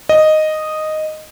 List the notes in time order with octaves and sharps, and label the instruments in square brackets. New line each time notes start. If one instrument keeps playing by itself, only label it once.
[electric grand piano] D#5